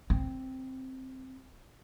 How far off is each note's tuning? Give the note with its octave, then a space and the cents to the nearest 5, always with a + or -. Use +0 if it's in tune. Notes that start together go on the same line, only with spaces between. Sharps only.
C4 +0